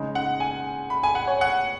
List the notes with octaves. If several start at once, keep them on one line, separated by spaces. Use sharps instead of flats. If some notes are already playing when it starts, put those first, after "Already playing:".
Already playing: C#3 G#3 D#4
F#5
G#5
B5
G#5
F#5
C#5
F#5